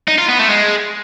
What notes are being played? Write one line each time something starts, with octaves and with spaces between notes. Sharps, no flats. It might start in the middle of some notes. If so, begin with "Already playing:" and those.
D#4
F4
B3
A3
G#3